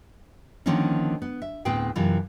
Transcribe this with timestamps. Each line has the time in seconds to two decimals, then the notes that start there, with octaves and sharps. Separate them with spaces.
0.66 D3 D#3 F3 A#3 C4 C#4
1.22 B3
1.42 E5
1.65 D2 A2 B3 C4 G#4 G5
1.96 F#2 C3 E3 F4